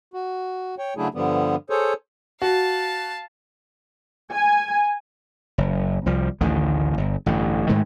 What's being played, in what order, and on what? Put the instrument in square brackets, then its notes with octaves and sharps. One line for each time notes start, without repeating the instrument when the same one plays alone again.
[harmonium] F#4
C#5 G5
C#3 F#3 A3 D4 E4 G#4
G2 D3 F3 G3 B3
G#4 A4 C5 C#5
[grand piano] F#4 [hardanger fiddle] F5 A5
[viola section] G#5
[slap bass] F#1
C2 F3 G3
A1 D2 D3 D#3
G1
A1 G2 D3
G#2 D#3 G#3 A3